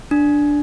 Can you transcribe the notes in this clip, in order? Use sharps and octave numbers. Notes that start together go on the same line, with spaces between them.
D4